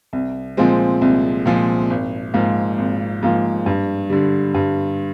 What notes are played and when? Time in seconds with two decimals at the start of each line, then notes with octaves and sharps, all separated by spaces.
0.13 C2
0.57 A#2 F3 G#3 C4
1.01 C2
1.46 A#2 F3 G#3 C4
1.90 G#1
2.34 G#2 F3 A#3 F4
2.78 G#1
3.23 G#2 F3 A#3 F4
3.66 G2
4.10 D3 G3
4.54 G2